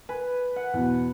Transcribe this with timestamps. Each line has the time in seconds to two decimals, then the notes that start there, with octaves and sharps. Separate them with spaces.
0.09 B4 G#5
0.56 F#5
0.74 E2 B2